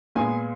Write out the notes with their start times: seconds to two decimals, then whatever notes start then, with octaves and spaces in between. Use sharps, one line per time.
0.15 A#2 G#3 B3 G#5